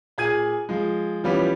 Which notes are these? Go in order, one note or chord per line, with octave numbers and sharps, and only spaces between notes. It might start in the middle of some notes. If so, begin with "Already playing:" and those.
A#2 G#4 G#6 D#7
F3 G#3
E3 F3 G3 B3 C#4 G4